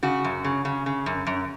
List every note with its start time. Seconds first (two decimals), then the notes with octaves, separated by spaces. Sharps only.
0.03 C#3 F#4
0.24 F#2
0.44 C#3
0.65 C#3
0.86 C#3
1.06 F#2
1.27 F#2